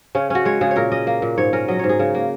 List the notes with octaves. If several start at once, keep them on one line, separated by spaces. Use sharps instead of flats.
C#3 C#4
C#4 F#4
G#3 C#5
C#3 G#4
C#5
A#2 A#4
C#4 D#5
A#3
A#2
G#2 C#5
C#4 A#4
F#3 D#5
G#2 C#5
G#4
C#3
A#3